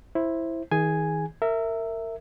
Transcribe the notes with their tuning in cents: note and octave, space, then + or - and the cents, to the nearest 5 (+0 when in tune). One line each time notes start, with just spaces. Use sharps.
E4 +0 C5 +15
D#3 +45 G#4 +0 G#5 +0
A#4 -25 E5 +0